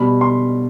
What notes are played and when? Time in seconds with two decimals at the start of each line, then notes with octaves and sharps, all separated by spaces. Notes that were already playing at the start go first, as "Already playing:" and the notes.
Already playing: B2 G3 B5
0.21 C6